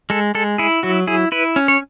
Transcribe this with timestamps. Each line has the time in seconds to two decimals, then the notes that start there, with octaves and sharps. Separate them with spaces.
0.10 G#3 A4
0.35 G#3 A4
0.58 E4 G#4
0.83 F#3 F#4
1.07 E4 G#4
1.32 E4 B4
1.56 C#4
1.68 C#5